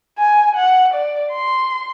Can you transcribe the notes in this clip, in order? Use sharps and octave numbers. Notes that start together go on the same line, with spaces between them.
G#5
F#5
D5
C6